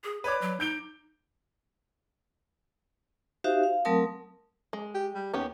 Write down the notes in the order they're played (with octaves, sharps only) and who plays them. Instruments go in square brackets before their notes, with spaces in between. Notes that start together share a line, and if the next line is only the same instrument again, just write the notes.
[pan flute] G#4
[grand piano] B4 D5 D6 [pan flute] C#5
[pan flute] F#3
[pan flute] D#4 [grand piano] G6 D7 G7
[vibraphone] D#4 F#4 G4 C5 E5 F5
F5
F#3 A3 C4 A#4 A5 D#6
[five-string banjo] G#3
[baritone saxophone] G4
G3
[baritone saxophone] D#2 [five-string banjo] B3 C#4 G4